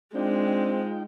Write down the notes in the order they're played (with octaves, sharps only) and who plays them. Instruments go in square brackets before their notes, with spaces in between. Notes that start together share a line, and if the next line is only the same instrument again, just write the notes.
[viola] G#3 [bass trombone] C4 [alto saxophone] D4 [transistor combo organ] D#4 F4 G5